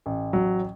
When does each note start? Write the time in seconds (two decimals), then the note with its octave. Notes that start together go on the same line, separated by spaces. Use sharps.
0.06 A1
0.33 F#3